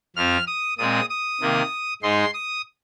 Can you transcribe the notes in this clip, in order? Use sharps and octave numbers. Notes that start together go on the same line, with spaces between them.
F2 F3 C4 F6
D#6
A#2 G#3 C4 D#6
D#6
C3 D#3 A#3
G#2 G#3 D#4 C6
D#6